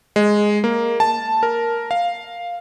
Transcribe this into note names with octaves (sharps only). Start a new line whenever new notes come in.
G#3
A#3
A5
A#4
F5